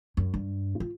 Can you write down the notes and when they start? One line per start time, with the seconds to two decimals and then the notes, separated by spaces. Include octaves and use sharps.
0.17 F#2
0.34 G2
0.80 F4